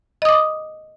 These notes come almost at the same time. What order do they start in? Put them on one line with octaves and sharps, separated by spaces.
D#5 D#6 D6